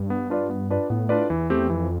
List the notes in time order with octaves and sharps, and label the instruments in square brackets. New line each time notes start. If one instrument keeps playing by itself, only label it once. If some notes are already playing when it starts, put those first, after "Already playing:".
Already playing: [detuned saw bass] G2
[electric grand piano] B3
D4 F4 B4 D5
B3
D4 F4 B4 D5
[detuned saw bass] A2 [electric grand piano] B3
[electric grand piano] D4 F4 B4 D5
[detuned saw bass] E2 [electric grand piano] E3
[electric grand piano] A3 C4 G4
[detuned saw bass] F2 [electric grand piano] E3